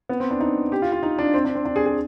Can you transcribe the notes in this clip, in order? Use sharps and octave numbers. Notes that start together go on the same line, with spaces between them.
B3
C4
D4
D#4
G4
F4
F4
D#4
D4
C4
D4
C4
D4
G#4
G#4